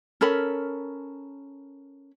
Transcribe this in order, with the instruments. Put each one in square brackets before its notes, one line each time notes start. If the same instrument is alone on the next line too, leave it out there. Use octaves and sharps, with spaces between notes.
[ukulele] C#4 A4 A#4 B5